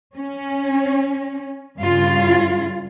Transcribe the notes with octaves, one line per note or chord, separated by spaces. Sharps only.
C#4
G2 C#3 F4